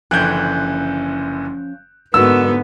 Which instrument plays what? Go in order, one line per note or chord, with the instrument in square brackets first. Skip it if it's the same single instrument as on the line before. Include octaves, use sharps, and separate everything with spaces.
[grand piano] F#1 D3 E3 [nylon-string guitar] F3 C#4 G5 [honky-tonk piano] F#6 G6
[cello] G#2 B3 [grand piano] D3 [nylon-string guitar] A#3 D#4 F#4 [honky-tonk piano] E6